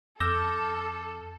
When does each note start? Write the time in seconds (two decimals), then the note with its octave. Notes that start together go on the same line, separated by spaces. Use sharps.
0.20 F2 A4 D6 E6 F6 G6 A#6